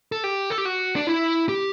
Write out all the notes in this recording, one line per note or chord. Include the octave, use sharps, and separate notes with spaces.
A4
G4
A4
G4
F#4
D4
E4
G4